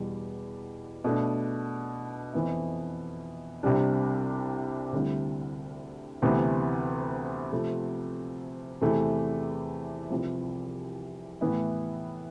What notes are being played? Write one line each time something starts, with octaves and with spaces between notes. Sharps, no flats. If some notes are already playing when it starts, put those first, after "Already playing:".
Already playing: E2 B2 G3
B2 A3 D4
F2 E3 B3 E4
C2 C3 G3 D4
D2 D3 G3 C4 E4
D2 C3 E3 B3
C3 F3 A3
E2 C3 E3 A3
C2 C3 F3
A2 E3 B3 E4